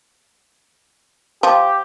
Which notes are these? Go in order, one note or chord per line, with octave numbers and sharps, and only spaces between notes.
F3 G4